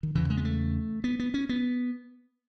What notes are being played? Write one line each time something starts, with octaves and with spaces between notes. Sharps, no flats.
D#3
E2 C#3 E3
G#3
B3
A3
B3
B3
C#4
B3